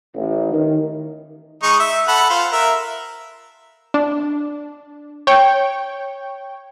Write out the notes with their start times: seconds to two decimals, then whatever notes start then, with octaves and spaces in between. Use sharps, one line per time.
0.15 A1
0.52 D#3
1.63 G#3 D#4 C#6
1.80 E5
2.08 A4 F#5 B5
2.30 F4 C5
2.52 A#4 E5
3.94 D4
5.27 C#5 G5